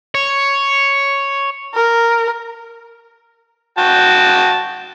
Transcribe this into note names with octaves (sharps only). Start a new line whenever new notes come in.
C#5
A#4
F#4 G5 A5